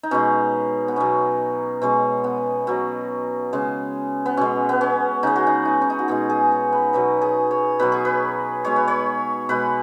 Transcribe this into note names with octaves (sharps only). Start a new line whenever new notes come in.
D#4
B2 G#3 C#4
B3
B2 F#3 C#4
B2 G#3 C#4
B3
B2 F#3
C#3 G#3
B3
B2 G#3 C#4
B3
C#4
C#3 G#3 D#4
F#4
D#4
D#4
C#4
D#4
F#4
B2 G#3 G#4
G#4
C#5
B4
B2 F#3 B4
G#4
C#5
B2 F#3 B4
G#4
B4
B2 G#3 C#5
B4
C#5
B2 G#3 B4